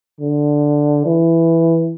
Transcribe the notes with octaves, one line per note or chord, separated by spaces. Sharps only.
D3
E3